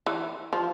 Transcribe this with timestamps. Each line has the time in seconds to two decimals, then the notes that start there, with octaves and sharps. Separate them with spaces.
0.06 E3
0.53 F3